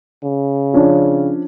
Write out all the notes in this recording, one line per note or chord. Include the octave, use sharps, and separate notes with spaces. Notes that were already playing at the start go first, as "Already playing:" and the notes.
C#3
F3 C#4 D4